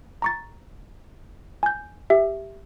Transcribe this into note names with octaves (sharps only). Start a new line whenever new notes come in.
A#5 C#6 A6
G#5 G6
G4 E5